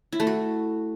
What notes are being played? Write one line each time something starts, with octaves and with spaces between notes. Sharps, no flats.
E4
A3
F#4